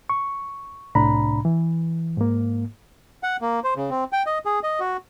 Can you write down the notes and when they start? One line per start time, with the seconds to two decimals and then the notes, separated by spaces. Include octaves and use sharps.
0.10 C#6
0.95 C2 A2 C3 D4 A#5 B5
1.45 E3
2.17 G#2 A#3
3.23 F#5
3.41 A#3
3.64 C5
3.76 C#3
3.90 C4
4.13 G5
4.26 D#5
4.45 G#4
4.63 D#5
4.80 F#4